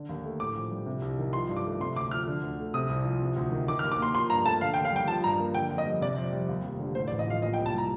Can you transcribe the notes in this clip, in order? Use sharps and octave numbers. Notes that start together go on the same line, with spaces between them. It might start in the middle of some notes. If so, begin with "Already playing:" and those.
Already playing: D3
D#2
A3
A2 D6
A#1
G3
C3
C2
D#3
F3 C6
G2
D6
A3
C3 C6
D2 D6
F3 F6
D3
D2
A3
C3 D#6
C2
F3
C3
D2
D#3
D#3 D6
F6
D#2
D6
A#3 C6
F3 C6
G2 A#5
A3 A5
D3 F5
G5
D#2
F5
G3 G5
F3 A5
G2 A#5
A#3
D3 G5
F2
D#5
G3
C3 D5
F2
G3
D#2
F1
D3
A2 C5
D5
A1
D#5
F3 F5
A#2 D#5
G5
C2
A5
G3 A#5